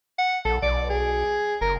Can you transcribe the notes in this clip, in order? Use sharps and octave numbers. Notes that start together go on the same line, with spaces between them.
F#5
A#1 A4
B1 D5
G#4
F#1 A#4